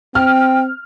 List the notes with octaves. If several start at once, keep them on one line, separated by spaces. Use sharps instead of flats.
C4 G5 F6